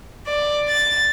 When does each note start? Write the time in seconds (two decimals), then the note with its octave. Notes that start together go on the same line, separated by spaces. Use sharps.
0.25 D5
0.68 A6